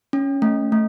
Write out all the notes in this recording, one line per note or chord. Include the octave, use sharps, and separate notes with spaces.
C#4
A3
A3